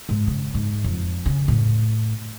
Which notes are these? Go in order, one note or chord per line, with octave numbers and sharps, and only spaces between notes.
G#2
C#3
G#2
F2
C#3
A2